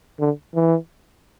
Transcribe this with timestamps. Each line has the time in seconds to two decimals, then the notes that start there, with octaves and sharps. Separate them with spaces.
0.20 D3
0.55 E3